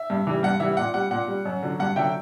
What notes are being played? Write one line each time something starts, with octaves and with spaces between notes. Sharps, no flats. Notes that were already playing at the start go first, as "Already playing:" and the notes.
Already playing: E5
G2
E3 G3
G2 F#5
E3 G3 E5
A#2 F#5
G3 F#5
A#2 F#5
G3
F#2
D3 F#3
G2 F#5
D3 F#3 E5 G5